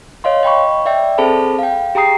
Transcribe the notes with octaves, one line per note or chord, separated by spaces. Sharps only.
C#5 D#5 F5 C6
D#5 G5 B5 C#6
D5 E5 G5
C4 G#4 A4 C5 A5 B5
F5 G5
G4 G#4 G5 A#5 D#6 C7